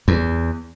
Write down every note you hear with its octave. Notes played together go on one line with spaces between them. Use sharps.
E2